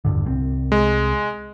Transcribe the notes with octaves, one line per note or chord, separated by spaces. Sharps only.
E1 G2 D3
C2 F#3 C4
G#3